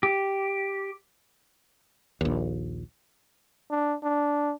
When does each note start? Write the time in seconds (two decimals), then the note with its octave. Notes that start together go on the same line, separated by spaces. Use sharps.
0.03 G4
2.21 A#1 D#2
3.71 D4
4.03 D4